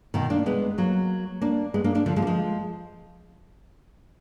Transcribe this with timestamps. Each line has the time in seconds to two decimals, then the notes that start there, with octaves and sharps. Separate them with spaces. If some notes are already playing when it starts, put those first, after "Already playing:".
0.14 B2 D#3
0.30 A#3 D4
0.46 G#3 B3
0.78 F#3 A#3
1.41 A#3 D4
1.74 G#3 B3
1.84 A#3 D4
1.95 A#3 D4
2.06 D3 F3
2.16 F3 G#3
2.22 A#3
2.27 F3 G#3